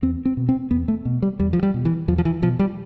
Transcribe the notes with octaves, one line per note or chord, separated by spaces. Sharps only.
E2 C4
C4
B2
C4
E2 B3
A3
B2
G3
E2 G3
F3
G3
B2
E3
E2 F3
F3
E3
B2 F3
G3